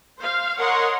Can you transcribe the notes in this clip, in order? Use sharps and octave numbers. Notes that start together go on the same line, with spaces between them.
C5 F5
A#4 C#5 D#5 F#5 A#5 C6